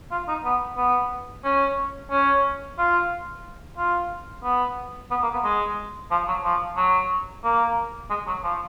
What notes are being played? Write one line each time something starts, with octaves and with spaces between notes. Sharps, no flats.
F4
D#4
B3
B3
C#4
C#4
F4
F4
B3
B3
A#3
B3
G#3
F3
F#3
F3
F#3
A#3
G#3
F#3
F3